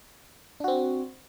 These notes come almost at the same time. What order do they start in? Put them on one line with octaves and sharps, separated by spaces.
D4 F#4 C4